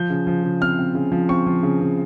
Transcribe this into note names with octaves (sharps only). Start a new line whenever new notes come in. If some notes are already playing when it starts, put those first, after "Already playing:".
Already playing: F3 G6
C#3
F3
C#3
C4 F6
C4
C#3
F3
C4 C#6
F3
C#3
C#3